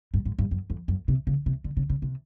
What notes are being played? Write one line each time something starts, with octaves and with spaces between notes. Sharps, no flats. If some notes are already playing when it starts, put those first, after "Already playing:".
G2
G#2
G2
F#2
F2
F#2
C3
C#3
C3
D3
C#3
C#3
C3